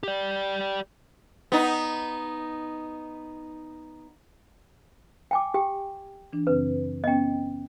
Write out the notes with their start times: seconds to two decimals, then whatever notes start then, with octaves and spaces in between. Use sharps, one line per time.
0.03 G4 D5
1.52 B3 D#4
5.31 G5 G#5 D6
5.54 G4 G5
6.33 E3 D4
6.47 F#2 C#3 C4 B4
7.04 B3 C#4 D#5 G5